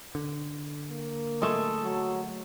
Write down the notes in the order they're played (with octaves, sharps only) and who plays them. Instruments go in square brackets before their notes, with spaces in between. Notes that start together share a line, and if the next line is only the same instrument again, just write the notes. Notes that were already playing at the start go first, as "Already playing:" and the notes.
[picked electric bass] D3
[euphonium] A#3
[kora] G#3 A3 [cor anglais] A4
[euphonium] F#3